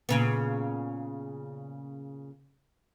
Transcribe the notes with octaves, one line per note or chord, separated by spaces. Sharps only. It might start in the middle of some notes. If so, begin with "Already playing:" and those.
A#2 C#3 B3